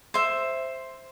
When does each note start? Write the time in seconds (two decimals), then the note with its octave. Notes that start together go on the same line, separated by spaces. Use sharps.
0.14 C5 E5